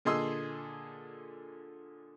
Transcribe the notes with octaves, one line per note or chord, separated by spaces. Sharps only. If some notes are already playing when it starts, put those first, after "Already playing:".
A#2 D3 G#4 D#5 C6 E6